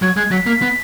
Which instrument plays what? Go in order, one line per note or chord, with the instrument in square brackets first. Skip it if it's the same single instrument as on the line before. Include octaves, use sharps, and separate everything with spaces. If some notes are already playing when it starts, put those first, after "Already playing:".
[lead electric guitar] F#3 [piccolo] G#6
[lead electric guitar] G#3 [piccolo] G#6
[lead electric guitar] F#3 [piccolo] B6
[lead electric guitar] A#3
B3